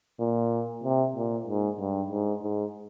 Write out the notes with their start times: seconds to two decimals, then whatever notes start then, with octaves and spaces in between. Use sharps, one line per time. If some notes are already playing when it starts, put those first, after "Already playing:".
0.20 A#2
0.84 C3
1.15 A#2
1.47 G#2
1.80 G2
2.11 G#2
2.43 G#2